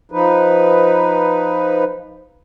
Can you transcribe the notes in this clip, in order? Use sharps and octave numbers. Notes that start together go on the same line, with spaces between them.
F3 D#4 B4